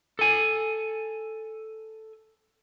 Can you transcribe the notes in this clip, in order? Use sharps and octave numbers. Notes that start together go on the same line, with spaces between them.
A4 G#5